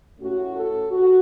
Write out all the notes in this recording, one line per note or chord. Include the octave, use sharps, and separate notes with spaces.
A2 A3 C#4 F#4
A4
F#4